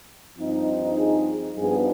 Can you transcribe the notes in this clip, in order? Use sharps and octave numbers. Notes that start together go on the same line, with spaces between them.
G2 F3 C4 D#4
G#4
G2 F3 B3 D#4 G#4